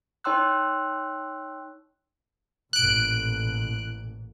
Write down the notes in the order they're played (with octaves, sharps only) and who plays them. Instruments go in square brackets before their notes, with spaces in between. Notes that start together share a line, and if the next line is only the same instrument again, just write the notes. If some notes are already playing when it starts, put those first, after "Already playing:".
[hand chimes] D#4 C#5 G5 C6 E6 F#6
[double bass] A1 A#2 [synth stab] F#6 D7